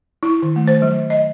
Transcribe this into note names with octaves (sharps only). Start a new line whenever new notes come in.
E4
D#3
A3
C5
F#3
D#5